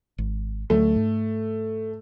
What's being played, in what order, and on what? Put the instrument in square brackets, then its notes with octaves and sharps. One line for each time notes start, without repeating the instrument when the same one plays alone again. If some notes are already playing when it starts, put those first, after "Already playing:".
[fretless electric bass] G#1
[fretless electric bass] D2 F#3 [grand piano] A3
[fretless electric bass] G#2